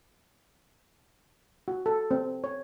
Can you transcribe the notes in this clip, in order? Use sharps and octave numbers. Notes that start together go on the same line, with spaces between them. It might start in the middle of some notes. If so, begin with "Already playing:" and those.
F#4
A4
C4
C#5